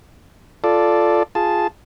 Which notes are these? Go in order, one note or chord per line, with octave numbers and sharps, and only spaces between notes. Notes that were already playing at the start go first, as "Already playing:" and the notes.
F4 A4 D5
F4 G#4 A5